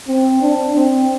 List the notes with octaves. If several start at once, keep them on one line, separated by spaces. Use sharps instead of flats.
C4
D4
C4